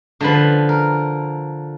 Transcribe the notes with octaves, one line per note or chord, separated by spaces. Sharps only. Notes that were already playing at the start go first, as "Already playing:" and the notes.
D3 F3 B4
A#4